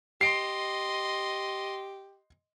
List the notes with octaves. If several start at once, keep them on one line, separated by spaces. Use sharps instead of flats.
G4 D#5 C6 C7 D7